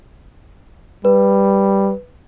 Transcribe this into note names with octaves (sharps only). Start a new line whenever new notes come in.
G3 B4